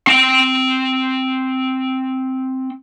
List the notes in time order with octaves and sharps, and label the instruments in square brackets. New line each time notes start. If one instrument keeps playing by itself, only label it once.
[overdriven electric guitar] C4 G5